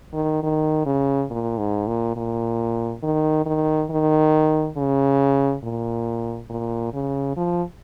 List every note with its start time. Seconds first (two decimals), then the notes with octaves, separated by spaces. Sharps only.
0.14 D#3
0.43 D#3
0.86 C#3
1.31 A#2
1.58 G#2
1.88 A#2
2.17 A#2
3.03 D#3
3.46 D#3
3.91 D#3
4.77 C#3
5.63 A#2
6.50 A#2
6.94 C#3
7.37 F3